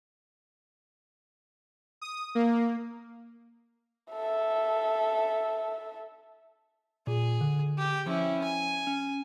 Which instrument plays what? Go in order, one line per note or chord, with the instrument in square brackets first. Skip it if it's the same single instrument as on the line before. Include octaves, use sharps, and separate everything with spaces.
[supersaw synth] D#6
A#3
[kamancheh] A4 E5
[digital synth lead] A#2 [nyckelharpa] G#4
[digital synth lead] D3
[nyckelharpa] G4
[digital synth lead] F3 [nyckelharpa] C#4 E4
[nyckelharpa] G#5
[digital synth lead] C#4